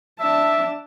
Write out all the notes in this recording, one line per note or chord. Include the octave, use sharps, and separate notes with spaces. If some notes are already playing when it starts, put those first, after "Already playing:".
D4 E5 A5